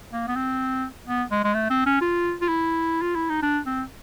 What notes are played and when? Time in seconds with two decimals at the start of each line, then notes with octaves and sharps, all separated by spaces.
0.12 A#3
0.28 B3
0.36 C4
1.07 B3
1.31 G#3
1.44 G#3
1.54 A3
1.70 C4
1.86 C#4
2.01 F4
2.41 F4
2.48 E4
3.01 F4
3.15 E4
3.29 D#4
3.42 D4
3.66 C4